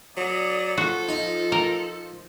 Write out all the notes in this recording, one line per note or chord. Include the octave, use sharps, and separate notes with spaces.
F#3 D5 D#6
F3 F#4 A4
D#4
A#4